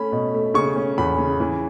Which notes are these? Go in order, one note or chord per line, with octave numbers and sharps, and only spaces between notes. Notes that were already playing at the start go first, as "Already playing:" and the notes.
Already playing: A3 C#4 B5
B2
A3
C#3 C#6
C#4
E2 B5
C#3
E3